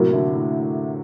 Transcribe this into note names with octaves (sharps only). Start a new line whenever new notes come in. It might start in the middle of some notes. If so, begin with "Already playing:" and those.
Already playing: A2 C3 F#3 A#3 F#4 A#4
D3
A2